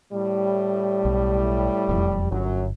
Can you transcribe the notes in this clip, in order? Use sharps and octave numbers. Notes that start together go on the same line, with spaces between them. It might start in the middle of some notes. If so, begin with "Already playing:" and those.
A2 G3
B1
E1 F2
G1 F#2 F#3